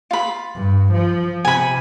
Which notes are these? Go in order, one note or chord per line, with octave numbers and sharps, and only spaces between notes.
F4 B5
G2
F3
C3 G#5 B5